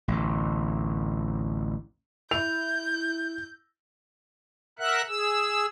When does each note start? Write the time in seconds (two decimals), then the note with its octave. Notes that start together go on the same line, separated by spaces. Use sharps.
0.08 A1 D2
2.31 E4 G6 F7
4.79 A#4 E5 F#5 F#6
5.08 G#4 E6